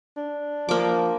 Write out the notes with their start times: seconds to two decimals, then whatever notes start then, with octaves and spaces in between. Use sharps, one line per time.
0.17 D4
0.69 F3 A#3 D6